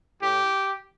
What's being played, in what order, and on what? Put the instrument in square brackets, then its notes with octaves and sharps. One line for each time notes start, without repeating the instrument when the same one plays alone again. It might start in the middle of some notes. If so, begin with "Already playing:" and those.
[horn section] A2 G4